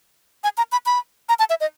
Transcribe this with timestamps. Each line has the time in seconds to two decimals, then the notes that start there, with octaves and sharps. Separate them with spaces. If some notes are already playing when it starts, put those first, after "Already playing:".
0.44 G#5
0.58 A#5
0.72 B5
0.86 B5
1.29 A#5
1.39 A5
1.50 E5
1.61 D#5